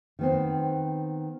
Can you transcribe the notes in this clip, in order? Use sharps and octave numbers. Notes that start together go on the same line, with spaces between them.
D#3 B3 C4